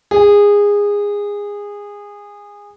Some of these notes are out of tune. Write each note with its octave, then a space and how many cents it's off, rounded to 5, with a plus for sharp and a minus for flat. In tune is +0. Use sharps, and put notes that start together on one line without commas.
G#4 -20